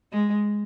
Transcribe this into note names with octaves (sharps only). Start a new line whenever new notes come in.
G#3